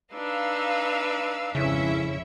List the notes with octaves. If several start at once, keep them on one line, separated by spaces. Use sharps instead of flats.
D4 D#4 B4 F5 E6
G#1 F2 C#3 C#4 E4 E5